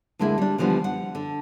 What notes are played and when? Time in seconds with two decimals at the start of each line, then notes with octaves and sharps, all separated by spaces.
0.19 D2 D3 G#3 A#3 E4
0.38 G3 D4
0.58 D3 E3 F3 G3 B3
0.84 F#5
1.15 D3